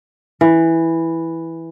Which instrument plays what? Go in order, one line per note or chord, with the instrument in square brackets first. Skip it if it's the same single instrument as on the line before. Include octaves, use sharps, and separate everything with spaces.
[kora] E3